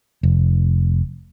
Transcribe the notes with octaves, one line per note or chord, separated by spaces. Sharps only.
F1